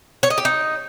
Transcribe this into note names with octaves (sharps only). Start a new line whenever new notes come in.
C#5
D#5
G4
D#4